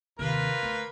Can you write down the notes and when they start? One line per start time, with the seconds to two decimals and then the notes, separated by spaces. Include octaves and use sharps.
0.19 D#2 C3 A#3 F4 B4
0.63 D2